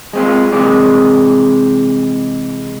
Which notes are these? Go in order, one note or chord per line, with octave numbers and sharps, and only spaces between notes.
G#3 C4 F4
C3 E3 G#3 G4